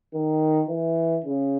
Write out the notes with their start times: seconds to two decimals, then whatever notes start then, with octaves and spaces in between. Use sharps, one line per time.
0.13 D#3
0.68 E3
1.25 C#3